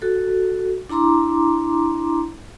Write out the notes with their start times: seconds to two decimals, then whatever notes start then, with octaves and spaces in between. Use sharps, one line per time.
0.02 F#4 A4
0.90 D4 E4 A#5 C6 D6